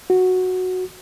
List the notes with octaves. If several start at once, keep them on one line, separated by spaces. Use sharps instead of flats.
F#4